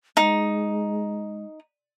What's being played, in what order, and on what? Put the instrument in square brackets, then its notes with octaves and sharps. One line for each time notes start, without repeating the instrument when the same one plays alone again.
[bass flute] G#3 [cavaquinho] D#4